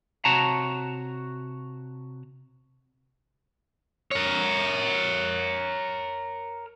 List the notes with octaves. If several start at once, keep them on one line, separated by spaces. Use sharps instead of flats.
C3 F#4 C#5 A5 A#5
A#4 C#5